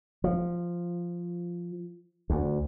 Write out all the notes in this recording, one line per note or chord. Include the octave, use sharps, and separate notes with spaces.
F3
D2